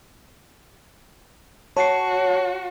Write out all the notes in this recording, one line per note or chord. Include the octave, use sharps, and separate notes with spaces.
F#4 C#5 A5 C7